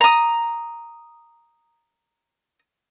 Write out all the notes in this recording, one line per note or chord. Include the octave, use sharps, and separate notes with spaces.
A#5 D#6